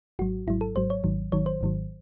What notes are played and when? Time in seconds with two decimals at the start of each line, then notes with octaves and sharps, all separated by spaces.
0.19 G#1 G#2 F#3 F#4
0.47 G#1 G#2 F#3 E4
0.61 A4
0.75 G#1 G#2 F#3 C5
0.90 C#5
1.04 G#1 G#2 D#3 F#3
1.32 G#1 G#2 D#3 F#3 C#5
1.46 C5
1.61 G#1 G#2 D#3 F#3